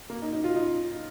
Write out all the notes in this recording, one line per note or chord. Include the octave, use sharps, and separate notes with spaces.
A#3
D#4
D#4
F4
D#4